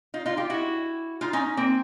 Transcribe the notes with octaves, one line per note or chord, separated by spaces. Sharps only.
D#4 F4
D#4 F4
F4 G4
E4 F#4
D#4 F4
C#4 D#4
A#3 C4